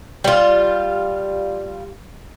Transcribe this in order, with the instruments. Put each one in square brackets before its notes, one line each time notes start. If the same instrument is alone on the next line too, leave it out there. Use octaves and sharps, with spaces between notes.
[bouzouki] G3 F4